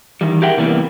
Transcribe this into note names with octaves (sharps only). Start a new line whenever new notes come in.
D#3 E3 G3
G4 G#4 A#4 E5 F#5 G5
C3 E3 G3 A#3 B3